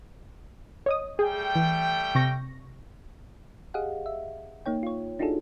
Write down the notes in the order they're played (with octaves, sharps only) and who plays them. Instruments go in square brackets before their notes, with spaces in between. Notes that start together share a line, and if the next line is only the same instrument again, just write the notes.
[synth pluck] C#5 D#5 D#6
[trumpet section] G3 A3 G5 [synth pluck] G#4
[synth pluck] E3
C3 C#6 A#6
G4 G#4 D#5 F5 F#5
E5
A#3 D#4 C#5 G5
F4 C#5
D4 D#4 F4 F#4 G#4 A4